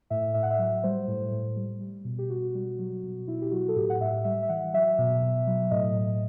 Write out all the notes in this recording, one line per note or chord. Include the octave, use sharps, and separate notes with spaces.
A2 E5
A2 E5
F#5
E5
F#3
G3 C5
A2
A2
G3
G3
B2
G4
B2 F#4
G3
F#3
B2
B2 E4
G4
F#3 F#4
A4
A2 G4
F#5
A2 E5
G3 E5
E5
E3 F#5
F#3 E5
B2
B2
F#3
A2 D#5
A2